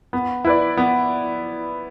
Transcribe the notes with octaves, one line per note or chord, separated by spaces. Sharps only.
B3
E4 B4 D5
B3